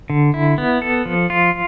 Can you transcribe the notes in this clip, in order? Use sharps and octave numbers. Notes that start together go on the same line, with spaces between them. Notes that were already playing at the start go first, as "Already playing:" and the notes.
D3
E4
B3
A4
F3
F4